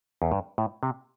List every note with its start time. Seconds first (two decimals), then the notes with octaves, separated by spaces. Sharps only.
0.22 E2
0.32 G2
0.58 A2
0.83 C3